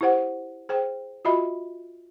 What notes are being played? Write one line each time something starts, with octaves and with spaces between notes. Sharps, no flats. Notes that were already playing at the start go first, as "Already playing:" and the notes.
E4 G4 C5 F#5
G#4 C5 G5
F4 F#4 D#5 E5 B5